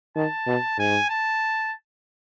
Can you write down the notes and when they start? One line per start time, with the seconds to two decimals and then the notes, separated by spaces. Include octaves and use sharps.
0.16 D#3 A5
0.47 B2
0.78 G#2 G#5
1.10 A5